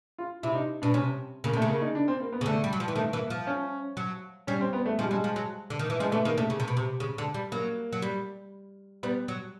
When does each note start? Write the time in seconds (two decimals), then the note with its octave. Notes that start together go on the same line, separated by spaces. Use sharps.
0.18 F4
0.43 C3 E4
0.55 D#4
0.82 B2 D4
0.94 C3 C#4
1.44 C#3 A#3
1.53 C3
1.57 A3
1.62 C#3
1.69 A#3
1.82 D#4
1.95 D4
2.08 C4
2.20 A#3
2.33 B3
2.41 C#3
2.46 D3 A3
2.64 G3
2.73 F#3
2.80 F3
2.88 E3
2.96 D#3 A3
3.13 E3 A#3
3.30 F3
3.47 C#4
3.97 F#3
4.47 G3 C#4
4.61 C4
4.73 B3
4.86 A3
4.98 F3 G#3
5.06 G3
5.11 F#3 G#3
5.24 F3
5.36 F#3
5.70 D3
5.79 D#3
5.90 E3
6.00 F3 G#3
6.12 E3 A3
6.25 D#3 A#3
6.38 C3 A3
6.50 C#3
6.60 C3
6.68 B2
6.77 C3
7.00 C#3
7.18 D3
7.34 G3
7.52 F#3 A#3
7.93 F#3
8.02 G3
9.03 G3 B3
9.28 F#3